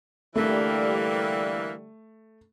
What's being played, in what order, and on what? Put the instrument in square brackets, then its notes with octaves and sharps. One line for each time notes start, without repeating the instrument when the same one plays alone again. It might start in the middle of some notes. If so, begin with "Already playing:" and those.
[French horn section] D3 G3 [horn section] E3 A#3 [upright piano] A3